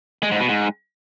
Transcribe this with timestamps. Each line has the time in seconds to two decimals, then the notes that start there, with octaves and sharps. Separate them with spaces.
0.23 G#3
0.31 G#2
0.40 B2
0.49 G#2